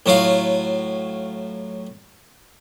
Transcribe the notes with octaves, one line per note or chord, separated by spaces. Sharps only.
A2 F#3 F4 F5